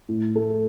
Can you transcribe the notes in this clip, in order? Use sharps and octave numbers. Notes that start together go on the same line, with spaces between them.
A2
A3